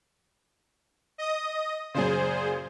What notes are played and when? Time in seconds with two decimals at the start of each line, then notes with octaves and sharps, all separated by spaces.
1.18 D#5 D#6
1.94 F#2 A#2 C#3 G#4 C5